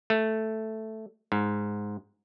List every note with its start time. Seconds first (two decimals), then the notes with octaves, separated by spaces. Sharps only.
0.10 A3
1.32 G#2